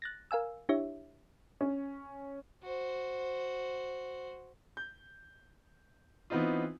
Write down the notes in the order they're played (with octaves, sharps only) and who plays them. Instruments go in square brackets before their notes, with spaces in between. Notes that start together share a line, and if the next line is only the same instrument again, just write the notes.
[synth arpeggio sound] F#6 A6 A#6
A#4 F5 G#5 E6
D4 E4 G4 C#5 E5
[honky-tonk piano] C#4
[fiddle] F#4 C5
[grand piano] G6
E3 B3 C4 D#4 F4